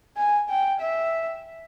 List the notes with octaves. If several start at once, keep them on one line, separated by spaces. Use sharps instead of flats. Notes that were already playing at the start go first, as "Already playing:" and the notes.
G#5
G5
E5